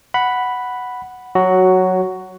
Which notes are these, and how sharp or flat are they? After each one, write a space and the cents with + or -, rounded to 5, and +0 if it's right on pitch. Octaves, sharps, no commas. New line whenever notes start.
F#5 +0 B5 +0
F#3 +0 F#4 +10